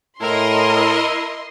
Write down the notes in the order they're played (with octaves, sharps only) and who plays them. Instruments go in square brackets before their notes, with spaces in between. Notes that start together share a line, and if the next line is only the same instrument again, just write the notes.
[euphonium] A2 [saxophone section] E4 [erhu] A#4 [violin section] D#5 C6